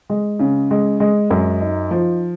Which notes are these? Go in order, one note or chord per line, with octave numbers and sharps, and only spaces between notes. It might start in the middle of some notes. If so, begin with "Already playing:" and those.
G#3
C#3
G#3
G#3
F#2
D#4
F3